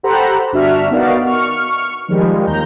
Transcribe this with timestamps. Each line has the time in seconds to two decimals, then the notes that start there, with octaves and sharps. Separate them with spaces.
0.03 G4 A4 C5 F#5 A#5 B5
0.52 G1 D4 F#4 E5 F6
0.90 B3 D#4 F#4 A#4 D5 F5
1.26 C#6 F6
2.08 D#3 F3 G3 G#3
2.47 D#2 A#5 G6